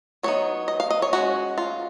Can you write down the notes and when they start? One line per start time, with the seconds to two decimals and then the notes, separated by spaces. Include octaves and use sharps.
0.23 F#3 B3 D#4 C#5
0.68 D#5
0.80 F5
0.91 D#5
1.02 C#5
1.13 G#3 C#4 F#4
1.58 F4